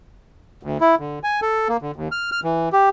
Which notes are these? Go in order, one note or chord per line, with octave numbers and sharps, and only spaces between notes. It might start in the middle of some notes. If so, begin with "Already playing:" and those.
D2
E4
D3
G#5
A4
A#3
D3
D#2
F6
F6
E3
G4